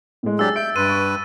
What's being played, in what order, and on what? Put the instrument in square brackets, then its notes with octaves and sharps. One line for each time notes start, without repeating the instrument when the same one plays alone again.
[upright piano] A2 G#3
[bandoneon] F#3 D4 G4 [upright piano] G#4 [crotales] E6 A6
[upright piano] E5 D7 [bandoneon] G6
[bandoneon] G2 B4 [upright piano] C6 [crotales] D#7
[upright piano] C#6